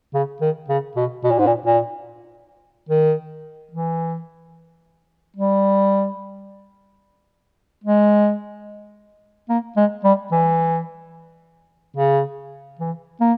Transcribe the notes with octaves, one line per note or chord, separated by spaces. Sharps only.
C#3
D#3
C#3
B2
B2
A#2
G#2
A#2
A#2
D#3
E3
G3
G#3
A#3
G#3
G3
E3
C#3
E3
A#3